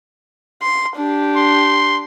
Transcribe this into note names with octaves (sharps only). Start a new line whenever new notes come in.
C6
D4 G4
C6